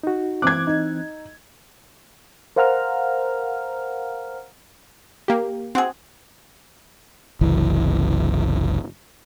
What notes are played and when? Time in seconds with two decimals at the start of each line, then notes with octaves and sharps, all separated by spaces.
0.03 D#4 F#4
0.42 E3 C4 D6 F#6 G#6
0.67 D#4
2.56 A#4 C5 F5 F#5 A#5 F6
5.28 A#3 G4
5.75 C4 F#4 G#4
7.41 F#1 C2 E3